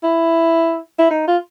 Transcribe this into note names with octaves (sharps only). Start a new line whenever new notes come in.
E4
E4
D#4
F4